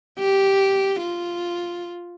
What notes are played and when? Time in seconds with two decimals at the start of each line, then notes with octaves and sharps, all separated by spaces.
0.19 G4
1.01 F4